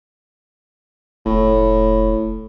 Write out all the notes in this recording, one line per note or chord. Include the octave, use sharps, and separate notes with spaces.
F1 A2